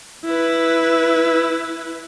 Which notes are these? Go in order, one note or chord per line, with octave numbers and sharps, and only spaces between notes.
E4 B4